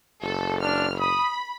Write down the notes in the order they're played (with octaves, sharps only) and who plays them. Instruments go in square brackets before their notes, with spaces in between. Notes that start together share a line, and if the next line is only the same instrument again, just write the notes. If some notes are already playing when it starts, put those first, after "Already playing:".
[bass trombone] F#1 [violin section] A4
[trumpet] D4 [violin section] F6
[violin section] B5 [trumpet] D#6